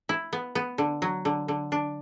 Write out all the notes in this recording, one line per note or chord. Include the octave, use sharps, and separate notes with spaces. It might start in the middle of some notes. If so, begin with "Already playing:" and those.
E4
B3
B3
D3
F#3
D3
D3
D4